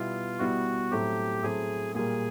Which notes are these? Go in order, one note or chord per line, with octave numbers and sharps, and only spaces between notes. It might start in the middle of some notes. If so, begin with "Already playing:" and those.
Already playing: B2 G3 B3 E4 F4
B2 G3 B3 E4 F#4
A2 F#3 A3 C4 G4
A2 F#3 A3 C4 G#4
A#2 G3 A#3 G#4